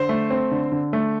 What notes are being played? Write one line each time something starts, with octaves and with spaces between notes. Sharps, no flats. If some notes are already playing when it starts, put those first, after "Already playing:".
Already playing: D3 C5
A3
C4
D3
D3
A3